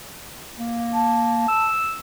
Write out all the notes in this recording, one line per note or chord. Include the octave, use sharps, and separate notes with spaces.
A#3
A5
E6